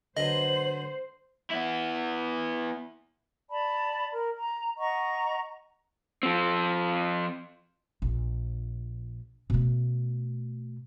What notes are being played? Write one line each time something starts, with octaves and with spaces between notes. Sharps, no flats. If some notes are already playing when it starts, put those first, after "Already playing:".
D3 F#3 B3 C5 D#5 F#7
B3 E4
D5 A5 B5
A#4
A#5
D#5 F#5 A#5 C#6
F3 C4
A#1
B2 A3